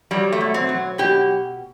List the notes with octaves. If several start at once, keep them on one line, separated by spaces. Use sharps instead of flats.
F#3 G3
A3
B2
C4
F#3
B2 G4